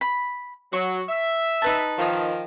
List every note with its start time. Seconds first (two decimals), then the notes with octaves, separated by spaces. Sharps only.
0.01 B5
0.73 F#3 C#6
1.08 E5
1.62 D#4 B4 A5
1.98 D#3 F3